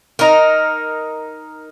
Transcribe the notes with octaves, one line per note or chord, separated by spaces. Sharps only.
D#4 A#4